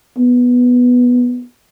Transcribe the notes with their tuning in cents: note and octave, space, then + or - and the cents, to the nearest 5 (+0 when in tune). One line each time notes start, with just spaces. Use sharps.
B3 -5